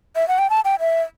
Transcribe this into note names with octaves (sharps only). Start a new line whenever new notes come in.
E5
F#5
G5
A5
G5
E5